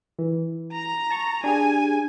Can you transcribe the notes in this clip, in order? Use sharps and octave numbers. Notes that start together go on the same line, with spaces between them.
E3
A#5
A5 C#6
D4 G4 G#4 G#5